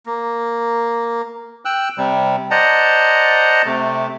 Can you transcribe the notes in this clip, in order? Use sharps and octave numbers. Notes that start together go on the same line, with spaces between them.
A#3
G5 E6 F#6
C3 G3
C5 D5 D#5 F#5 A5 A#5
C3 A3